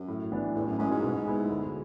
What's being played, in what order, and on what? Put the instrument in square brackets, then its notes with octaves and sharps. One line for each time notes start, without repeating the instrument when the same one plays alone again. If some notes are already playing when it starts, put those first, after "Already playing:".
Already playing: [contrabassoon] F#2
[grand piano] A2
E3 B3 D4
[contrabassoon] E2 [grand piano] A2
[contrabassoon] F#2
[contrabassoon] F#2 [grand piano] G#3 C#4 E4
[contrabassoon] G#2
[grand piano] B2
G#3 B3 E4
D2